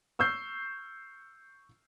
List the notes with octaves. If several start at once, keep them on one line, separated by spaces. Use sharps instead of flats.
C#6 E6 F6 G6 C7